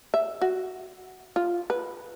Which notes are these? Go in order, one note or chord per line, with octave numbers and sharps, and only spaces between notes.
E5
F#4
F4
B4